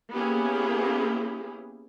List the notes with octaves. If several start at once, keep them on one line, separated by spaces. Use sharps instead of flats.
A#3 B3 C#4 E4 G4 G#4